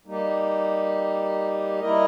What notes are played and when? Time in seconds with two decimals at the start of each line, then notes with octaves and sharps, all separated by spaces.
0.06 G3 A#3 D#4 G4
1.80 G3 A#3 E4 A#4 D#5